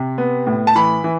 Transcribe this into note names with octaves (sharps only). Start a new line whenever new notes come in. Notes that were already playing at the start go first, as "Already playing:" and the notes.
Already playing: C3
B3
A2
A5
E3 B5
E3